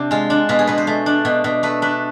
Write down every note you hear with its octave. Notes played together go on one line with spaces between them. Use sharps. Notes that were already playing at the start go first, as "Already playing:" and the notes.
Already playing: C3 D4
G#3 F4
D4
B2 F4
G#4
B2 B4
C5
A3
D4
B2
B2
A3 B4
D4 B4